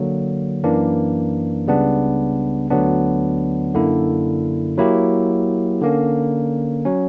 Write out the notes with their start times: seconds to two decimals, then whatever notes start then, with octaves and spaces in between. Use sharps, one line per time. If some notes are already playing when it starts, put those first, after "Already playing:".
Already playing: D3 F#3 A#3
0.63 F#2 E3 A#3 D4
1.67 C#2 C#3 G3 B3 D4
2.70 D2 D3 F#3 B3 D4
3.74 F#2 D3 A#3 E4
4.77 F#3 A#3 E4 G4
5.81 D3 A#3 C#4
6.85 F#3 C#4